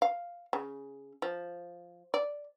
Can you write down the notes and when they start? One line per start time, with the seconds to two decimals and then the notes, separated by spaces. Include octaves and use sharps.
0.02 F5
0.53 C#3
1.22 F3
2.14 D5